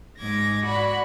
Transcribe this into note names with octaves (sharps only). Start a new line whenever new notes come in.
G#2 D6 G#6 A#6
F#4 D5 F#5 B5